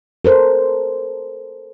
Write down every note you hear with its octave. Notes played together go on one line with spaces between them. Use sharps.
A4 A#4 C5